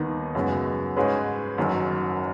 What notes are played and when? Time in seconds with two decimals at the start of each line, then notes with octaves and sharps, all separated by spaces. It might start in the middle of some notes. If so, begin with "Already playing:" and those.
Already playing: D#2 D#3 B3 D#4
0.35 F#2 C#3 G#3 B3
0.96 G#2 G#3 C#4 B4
1.58 F#1 F#2 D#3